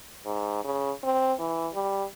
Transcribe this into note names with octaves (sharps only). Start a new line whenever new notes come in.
G#2
C#3
C4
E3
G3